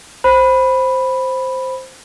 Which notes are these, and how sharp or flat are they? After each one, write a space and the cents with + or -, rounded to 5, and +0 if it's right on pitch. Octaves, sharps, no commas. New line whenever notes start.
C5 +0 B5 +0